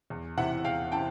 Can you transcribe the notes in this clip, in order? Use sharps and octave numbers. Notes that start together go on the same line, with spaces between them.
E2
C3 E3 E5 F#5
E2 F5 G5
C3 E3 G5 A5